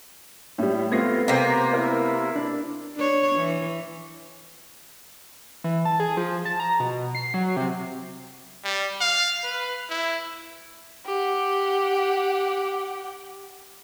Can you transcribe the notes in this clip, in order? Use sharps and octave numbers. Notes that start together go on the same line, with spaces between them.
A2 G3
A3 B3 C4 F4 G#6 A#6 C7
C3 A#3 C5 G6 A#6
E4 A#4
D4 D5
D4 C#5
E3
E3
A5
G#4
F3
A5
A#5
B2
C7
F#3
C3
G3
F5
B4
E4
G4 F#5